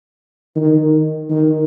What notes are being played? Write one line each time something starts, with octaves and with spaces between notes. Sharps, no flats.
D#3
D#3